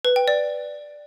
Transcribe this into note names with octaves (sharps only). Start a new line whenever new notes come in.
B4
G5
D5